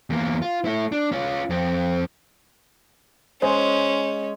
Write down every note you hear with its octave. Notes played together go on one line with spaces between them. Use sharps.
E2 A#3
F4
A3 E4
D4
C#4 F4
F2 C4
G#3 C#4 C5